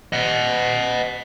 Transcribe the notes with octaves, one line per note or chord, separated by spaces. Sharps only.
D#5 F#5